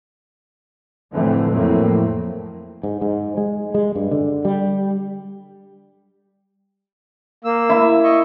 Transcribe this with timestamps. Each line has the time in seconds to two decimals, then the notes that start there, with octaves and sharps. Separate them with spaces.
1.13 F2 A2 D3 E3 A3 C4
1.52 F2 A2 F#3 A3 A#3 C4
2.83 G#2
3.01 G#2
3.37 G#3
3.74 G#3
3.95 G2
4.11 D3
4.45 G3
7.44 A#3 E6
7.69 E4 E5
8.04 D#5 C#6